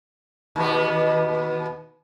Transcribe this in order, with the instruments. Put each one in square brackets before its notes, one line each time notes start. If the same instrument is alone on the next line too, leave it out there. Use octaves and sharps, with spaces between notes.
[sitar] D#2 B2 B3